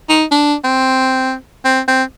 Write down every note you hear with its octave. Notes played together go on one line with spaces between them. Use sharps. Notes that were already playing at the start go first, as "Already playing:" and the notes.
D#4
D4
C4
C4
C4